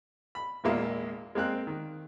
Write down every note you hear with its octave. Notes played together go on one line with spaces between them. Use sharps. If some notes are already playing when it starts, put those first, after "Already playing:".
B5
G#1 E2 A#2 G#3 A#3 E5
G#3 A#3 C4 F#6
D#3